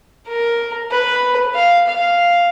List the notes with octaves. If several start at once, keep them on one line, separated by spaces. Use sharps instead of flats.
A#4
B4
F5
F5